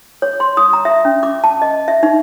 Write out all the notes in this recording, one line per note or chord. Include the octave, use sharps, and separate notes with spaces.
C#5
C6
D#6
A#5
E5
C#4
D6
A5
D#5
E5
D#4